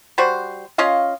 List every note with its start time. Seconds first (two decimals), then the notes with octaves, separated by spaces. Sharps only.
0.18 G3 F#4 C5
0.78 C#4 F4 D#5 F5